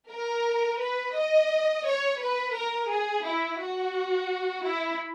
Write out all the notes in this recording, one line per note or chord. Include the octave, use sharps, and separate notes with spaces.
A#4
B4
D#5
C#5
B4
A#4
G#4
E4
F#4
E4